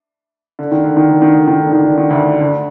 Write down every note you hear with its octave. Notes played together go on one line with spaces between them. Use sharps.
D3
D#3
D3
D#3
D3
D#3
D3
D#3
D3
D#3
D3
D#3
D2 D3
D2 D3